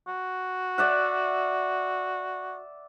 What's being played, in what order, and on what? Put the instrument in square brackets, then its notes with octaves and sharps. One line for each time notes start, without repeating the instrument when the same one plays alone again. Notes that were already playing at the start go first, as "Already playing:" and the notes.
[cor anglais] F#4
[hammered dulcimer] D5 E5 F#5